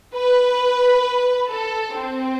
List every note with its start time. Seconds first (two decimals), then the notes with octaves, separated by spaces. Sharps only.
0.15 B4
1.50 A4
1.95 C4